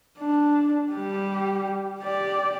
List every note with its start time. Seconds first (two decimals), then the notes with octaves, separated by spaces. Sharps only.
0.19 D4
0.92 G3 G4
1.99 G4 D5